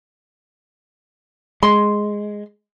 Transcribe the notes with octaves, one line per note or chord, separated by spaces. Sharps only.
G#3 C6